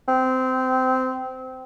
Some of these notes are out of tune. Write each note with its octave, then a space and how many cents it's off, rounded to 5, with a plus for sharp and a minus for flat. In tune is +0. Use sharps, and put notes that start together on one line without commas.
C4 -20